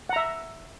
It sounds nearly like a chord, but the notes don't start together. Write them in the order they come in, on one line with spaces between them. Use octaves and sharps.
F#5 A#5 E5